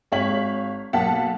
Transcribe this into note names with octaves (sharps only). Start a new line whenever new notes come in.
G#1 C#5 F5 B6 F#7
B1 A#3 F5 F#5 A5 B6